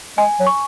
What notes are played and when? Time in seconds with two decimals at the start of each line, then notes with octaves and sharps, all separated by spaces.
0.17 G#3 G#5
0.40 F#3
0.47 C#6